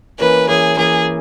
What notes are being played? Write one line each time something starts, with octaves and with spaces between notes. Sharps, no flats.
E3 A#3 C#4 B4
E3 A#3 C#4 G#4
E3 A#3 C#4 G#4